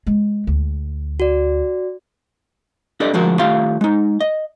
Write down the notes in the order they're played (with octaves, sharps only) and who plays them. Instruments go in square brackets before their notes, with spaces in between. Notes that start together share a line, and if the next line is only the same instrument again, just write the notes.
[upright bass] G#3
D2
[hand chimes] F#4 D5
[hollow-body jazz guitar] D4 G4 A4 B4 D5 D#5
D2 F3 G#3 F#4 A#4
D#3 A3 F4 G4 F5 C6
G#3 D#4
D#5